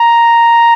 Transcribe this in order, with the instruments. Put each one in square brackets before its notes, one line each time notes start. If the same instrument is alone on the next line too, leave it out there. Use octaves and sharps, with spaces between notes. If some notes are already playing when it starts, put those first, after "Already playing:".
Already playing: [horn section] A#5